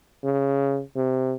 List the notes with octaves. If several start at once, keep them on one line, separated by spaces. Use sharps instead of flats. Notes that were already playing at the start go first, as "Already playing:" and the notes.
C#3
C3